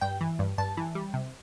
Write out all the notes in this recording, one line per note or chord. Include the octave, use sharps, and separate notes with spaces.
G2 G5
E3
G2
G2 A5
E3
G3
C3